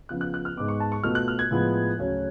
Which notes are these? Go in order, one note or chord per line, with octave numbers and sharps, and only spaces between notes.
C#3 F3 B3 F4 F#6
F#6
F#6
F6
G#2 G#3 B3 D6
C#6
A5
C#6
B2 A3 F4 F6
F#6
F6
G#6
A2 F3 G#3 B3 F4
D2 C#3 F#3 A3 C#4